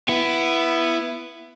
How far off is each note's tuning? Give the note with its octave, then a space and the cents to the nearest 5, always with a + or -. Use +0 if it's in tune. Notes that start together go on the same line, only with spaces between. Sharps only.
B3 +0 E4 +15